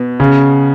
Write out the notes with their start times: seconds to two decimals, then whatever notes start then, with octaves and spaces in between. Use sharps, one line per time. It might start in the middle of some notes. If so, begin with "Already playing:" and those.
Already playing: B2
0.20 C#3